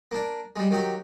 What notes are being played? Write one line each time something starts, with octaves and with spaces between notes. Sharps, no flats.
A#3 D4
G3 G#3
D#3 F#3 G4